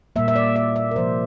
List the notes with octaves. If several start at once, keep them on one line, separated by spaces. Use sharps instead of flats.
A#2 G3 A#3 E5
E5
D5
E5
E5
A#4
C3 F3 A#3 C5